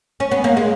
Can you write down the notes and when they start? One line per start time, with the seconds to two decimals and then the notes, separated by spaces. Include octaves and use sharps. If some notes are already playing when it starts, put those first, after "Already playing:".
0.20 C#4
0.31 B3
0.44 A#3
0.57 G#3